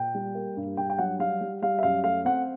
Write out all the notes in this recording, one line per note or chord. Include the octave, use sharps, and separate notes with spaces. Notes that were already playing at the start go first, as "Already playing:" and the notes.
Already playing: A#2 G5
G3
A#3
G2
G2 G5
G5
F#3 F#5
G3 F5
G3
G3 F5
E5
F#2 F5
A3 F5
C4 F#5